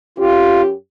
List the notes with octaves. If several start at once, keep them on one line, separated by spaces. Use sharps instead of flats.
F#2 C#4 F4 G4